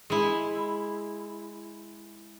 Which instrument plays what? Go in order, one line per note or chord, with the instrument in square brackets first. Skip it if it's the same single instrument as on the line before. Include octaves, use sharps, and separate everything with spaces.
[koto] G#3 E4